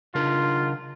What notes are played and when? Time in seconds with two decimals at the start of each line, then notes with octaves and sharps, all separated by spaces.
0.15 C#3 D4 F4 A#4